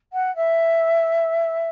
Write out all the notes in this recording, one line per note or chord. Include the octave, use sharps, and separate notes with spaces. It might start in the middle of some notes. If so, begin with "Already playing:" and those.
F#5
E5